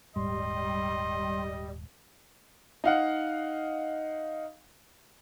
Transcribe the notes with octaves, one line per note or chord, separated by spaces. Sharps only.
D#1 G#2 G3 D#5 C6
D#4 F5 F#5